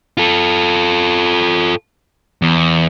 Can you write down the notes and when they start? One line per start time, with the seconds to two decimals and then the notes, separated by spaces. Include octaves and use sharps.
0.18 F4 A4
2.42 E2